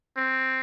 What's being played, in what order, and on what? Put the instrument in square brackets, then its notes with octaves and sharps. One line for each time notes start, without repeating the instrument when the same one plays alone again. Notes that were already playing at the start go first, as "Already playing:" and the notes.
[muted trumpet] C4